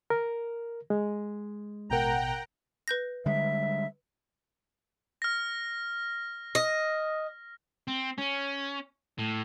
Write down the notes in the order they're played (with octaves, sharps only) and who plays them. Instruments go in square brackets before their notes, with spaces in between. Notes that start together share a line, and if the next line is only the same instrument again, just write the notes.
[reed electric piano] A#4
G#3
[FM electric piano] A1 B2 A#4 [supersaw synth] F#5 G5 A#5
[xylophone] B4 G6 A#6
[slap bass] D3 G3 G#3 [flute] E5
[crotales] F6 A#6
[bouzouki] D#5
[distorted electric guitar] C4
C#4
A2